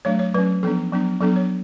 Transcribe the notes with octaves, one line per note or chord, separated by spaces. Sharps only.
F#3 A3 D4 C#5
C#5
F#3 C#4 B4
F3 B3 D4 A4
F#3 B3 D4
F#3 B3 D4 A4
C#5